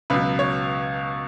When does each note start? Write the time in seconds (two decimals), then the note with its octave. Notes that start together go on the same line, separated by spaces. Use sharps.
0.10 C#2 B2 F#3 B4
0.39 C#5